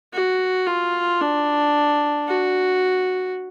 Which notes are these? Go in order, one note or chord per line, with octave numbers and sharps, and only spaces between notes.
F#4
F4
D4
F#4